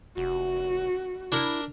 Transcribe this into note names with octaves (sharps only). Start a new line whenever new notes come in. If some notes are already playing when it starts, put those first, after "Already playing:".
F1 F#4
D4 E4 A#4